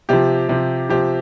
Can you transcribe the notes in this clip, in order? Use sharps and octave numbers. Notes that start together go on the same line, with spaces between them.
C3 F3 G4
C3 F3
C3 F3 G4